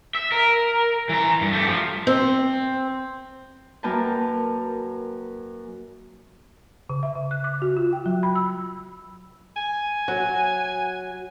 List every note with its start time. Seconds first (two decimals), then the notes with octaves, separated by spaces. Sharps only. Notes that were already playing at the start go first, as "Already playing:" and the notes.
0.15 E5
0.32 A#4
1.09 E3 A#5
1.41 G2
1.53 A3 G4
1.68 F3
2.07 C4
3.83 F#2 A#3 A#4 B4 G5 A5
6.89 C#3
7.03 E5
7.15 C#3
7.31 F#6
7.44 D6
7.62 F#4
7.77 F4
7.93 G5
8.06 F#3
8.23 B5
8.35 E6
9.56 G#5
10.08 F#3